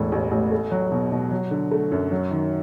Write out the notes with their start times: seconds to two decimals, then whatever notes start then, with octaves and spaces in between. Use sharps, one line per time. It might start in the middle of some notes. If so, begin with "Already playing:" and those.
Already playing: E1 A2 E3
0.12 A1
0.31 A1
0.51 A3
0.71 F#3
0.92 B2
1.12 B2
1.31 F#3
1.51 D3
1.71 A3
1.92 F#2
2.11 F#3
2.31 D#3